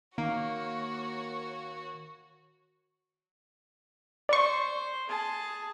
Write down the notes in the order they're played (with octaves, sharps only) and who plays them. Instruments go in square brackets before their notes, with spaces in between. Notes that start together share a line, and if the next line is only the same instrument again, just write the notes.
[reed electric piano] D#3 [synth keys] A#3 [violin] F#4 C#5
[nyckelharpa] C5 [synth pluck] D5 C#6
[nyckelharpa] G#4 A5